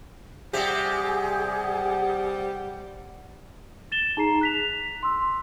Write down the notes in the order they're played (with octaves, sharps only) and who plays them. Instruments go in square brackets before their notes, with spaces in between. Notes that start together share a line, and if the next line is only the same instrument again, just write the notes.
[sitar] C3 G4 [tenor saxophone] G3 [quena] G#4 [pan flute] F#5
[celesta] A6 E7 G7
D#4 G#4 A#5 C7 E7
F#6 B6 F7
C6 E6